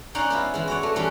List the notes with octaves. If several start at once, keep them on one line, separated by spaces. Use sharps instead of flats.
C#4 D#4 D5 F#5 A#5 C6
B3 E4 F4
E3 G#3
F#4 C#5 D5
A3
E3 G3 A3 C#4